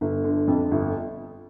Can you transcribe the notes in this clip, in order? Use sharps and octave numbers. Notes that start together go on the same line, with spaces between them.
G1
D3
F2
G1